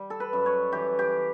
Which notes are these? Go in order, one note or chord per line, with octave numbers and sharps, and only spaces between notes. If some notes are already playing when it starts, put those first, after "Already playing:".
Already playing: G3
A4
B4
F#2
C#5
E3 G4
G4